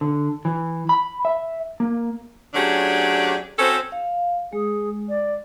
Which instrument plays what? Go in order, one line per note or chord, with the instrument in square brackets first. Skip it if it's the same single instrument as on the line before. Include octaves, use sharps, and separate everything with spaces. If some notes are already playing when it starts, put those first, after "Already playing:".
[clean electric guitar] D3
E3
B5
E5
A#3
[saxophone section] F#3 A3 C#4 D4 G4 G#4
C4 C#4 F#4 A4 C5
[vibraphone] F5
[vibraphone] G#3 [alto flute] G#4
[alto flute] D5